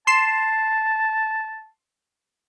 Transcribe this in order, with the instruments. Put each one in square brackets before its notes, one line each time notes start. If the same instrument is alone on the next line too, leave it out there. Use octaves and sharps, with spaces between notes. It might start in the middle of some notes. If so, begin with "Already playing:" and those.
[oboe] A5 [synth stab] C6 C7 E7